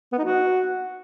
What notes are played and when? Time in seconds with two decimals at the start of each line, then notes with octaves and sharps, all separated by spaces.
0.12 B3
0.18 D#4
0.24 F#4